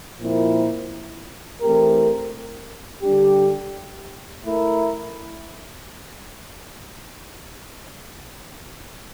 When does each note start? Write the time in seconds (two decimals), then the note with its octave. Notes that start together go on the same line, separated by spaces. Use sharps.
0.20 A#2 F3 C4 E4 A#4
1.61 E3 A3 C4 G4 A#4
3.02 D3 G3 D4 G4
4.44 A3 E4 A#4